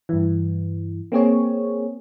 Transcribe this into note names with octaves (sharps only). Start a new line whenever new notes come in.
G2 E3
A#3 C4 G#4 C#5